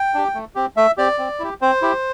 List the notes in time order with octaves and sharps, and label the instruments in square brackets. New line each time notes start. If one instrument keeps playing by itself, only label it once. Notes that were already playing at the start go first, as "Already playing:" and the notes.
Already playing: [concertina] G5
D4 G4
A3
C4 G4
A3 E5
C4 G4 D5
C4
E4 G4
C4 C5
E4 G4